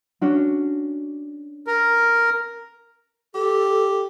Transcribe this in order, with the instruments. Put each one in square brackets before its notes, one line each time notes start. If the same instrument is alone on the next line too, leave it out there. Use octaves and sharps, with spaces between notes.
[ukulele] C#4 D4 F#4
[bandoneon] A#4
[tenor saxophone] G4 [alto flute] A4